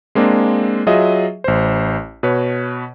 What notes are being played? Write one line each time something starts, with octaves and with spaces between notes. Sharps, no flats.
G#3 A#3 C4 D4
F#3 F4 G#4 D#5 E5
A1 C5
B2 B4 C#5